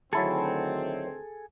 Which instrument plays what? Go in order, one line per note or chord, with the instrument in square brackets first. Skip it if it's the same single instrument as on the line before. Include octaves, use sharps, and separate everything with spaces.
[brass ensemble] D2 D#3 C4 [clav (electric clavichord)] F#3 E4 A5 [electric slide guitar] G#4 A4